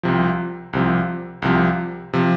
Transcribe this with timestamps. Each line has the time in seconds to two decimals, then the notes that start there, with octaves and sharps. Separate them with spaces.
0.03 C2 C3 F3
0.73 C2 C3 F3
1.42 C2 C3 F3
2.13 C3 F3